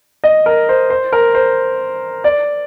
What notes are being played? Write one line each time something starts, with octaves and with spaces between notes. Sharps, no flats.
D#5
A#4
C5
C5
A#4
C5
D5